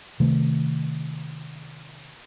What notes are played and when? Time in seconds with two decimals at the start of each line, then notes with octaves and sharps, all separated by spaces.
0.20 C3 D#3 A3